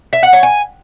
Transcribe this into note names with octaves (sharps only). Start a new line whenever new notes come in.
E5
F#5
C#5
G#5